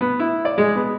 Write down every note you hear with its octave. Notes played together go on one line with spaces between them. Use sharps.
B3
E4
D5
G#3
B3